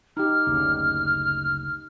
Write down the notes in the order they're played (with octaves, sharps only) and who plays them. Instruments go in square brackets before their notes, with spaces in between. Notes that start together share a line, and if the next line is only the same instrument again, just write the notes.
[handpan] D#4 G4 [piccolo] F6
[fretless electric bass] F#1 D2 C#3